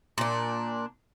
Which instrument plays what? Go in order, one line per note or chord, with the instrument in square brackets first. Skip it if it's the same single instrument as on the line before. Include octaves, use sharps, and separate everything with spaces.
[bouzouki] A#2 D4